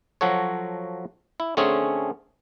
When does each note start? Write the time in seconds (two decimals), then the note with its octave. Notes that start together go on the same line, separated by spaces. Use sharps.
0.21 F3 F#3 F#4 A4 C#5
1.40 E4
1.57 D3 A3 C4 C#4 G#4